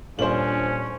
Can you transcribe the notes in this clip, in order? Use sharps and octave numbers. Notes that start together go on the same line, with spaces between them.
D#1 F3 C#4 D4 C5 F#7